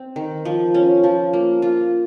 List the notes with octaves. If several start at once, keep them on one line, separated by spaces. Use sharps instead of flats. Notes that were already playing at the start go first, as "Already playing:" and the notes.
Already playing: C4
D#3
F3
C#4
F3
A#3
F4